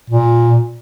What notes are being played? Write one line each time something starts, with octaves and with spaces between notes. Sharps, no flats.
A#2